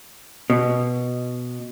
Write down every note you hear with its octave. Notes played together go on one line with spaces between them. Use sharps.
B2